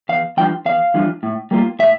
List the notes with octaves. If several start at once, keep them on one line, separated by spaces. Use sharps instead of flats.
E2 F5
E3 G3 D4 F4 G5
E2 F5
E3 G3 D4 F4
A2
G3 A#3 F4
A2 E5